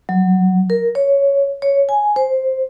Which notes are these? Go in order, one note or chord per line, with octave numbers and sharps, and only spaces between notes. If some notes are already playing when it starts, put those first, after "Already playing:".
F#3
A#4
C#5
C#5
G#5
C5